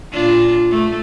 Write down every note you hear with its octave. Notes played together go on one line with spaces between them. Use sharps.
A#2 D4 F4
A3